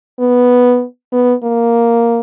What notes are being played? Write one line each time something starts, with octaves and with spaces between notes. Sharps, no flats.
B3
B3
A#3